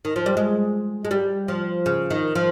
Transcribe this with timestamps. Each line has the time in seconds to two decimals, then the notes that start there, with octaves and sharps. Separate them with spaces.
0.05 D#3
0.16 F3
0.26 G3
0.37 G#3
1.05 G#3
1.11 G3
1.48 F3
1.86 C#3
2.10 D#3
2.35 F3